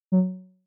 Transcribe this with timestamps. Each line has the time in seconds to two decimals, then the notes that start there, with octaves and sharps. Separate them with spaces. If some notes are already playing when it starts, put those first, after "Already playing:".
0.12 F#3